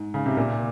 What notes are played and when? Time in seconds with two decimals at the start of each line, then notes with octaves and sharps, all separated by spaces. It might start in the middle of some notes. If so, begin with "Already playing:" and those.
Already playing: G#2
0.14 C#3
0.26 C3
0.37 A#2